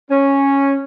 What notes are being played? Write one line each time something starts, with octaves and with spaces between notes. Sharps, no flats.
C#4